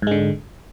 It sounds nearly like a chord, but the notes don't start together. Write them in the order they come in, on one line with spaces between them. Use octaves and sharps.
G#2 G#3 D3